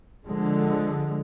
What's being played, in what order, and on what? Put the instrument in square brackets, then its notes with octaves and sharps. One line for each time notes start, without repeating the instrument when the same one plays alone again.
[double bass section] D3 F3 G#3